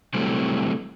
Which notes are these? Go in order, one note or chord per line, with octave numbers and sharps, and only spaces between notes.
C3 E3 F#3 G3 A3 C4